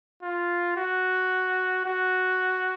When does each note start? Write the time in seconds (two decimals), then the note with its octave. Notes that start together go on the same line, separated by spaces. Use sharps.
0.22 F4
0.76 F#4
1.86 F#4